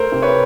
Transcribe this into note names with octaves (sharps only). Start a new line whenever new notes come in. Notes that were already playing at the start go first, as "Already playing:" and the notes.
Already playing: A3 A#4 C5
C3
B4 C#5